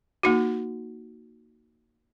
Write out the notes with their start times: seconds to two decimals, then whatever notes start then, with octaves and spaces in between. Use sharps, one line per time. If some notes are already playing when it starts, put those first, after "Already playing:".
0.23 A#3 D#4 F#4